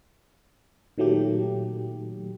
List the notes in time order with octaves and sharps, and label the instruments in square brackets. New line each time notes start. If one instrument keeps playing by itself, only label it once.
[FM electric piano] A#2 D#3 F#3 A3 G4